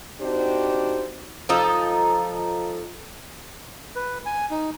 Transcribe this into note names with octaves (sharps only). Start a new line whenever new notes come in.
C4 D4 D#4 F#4 G4 C5
F3 D#4 A4
B4
G#5
D#4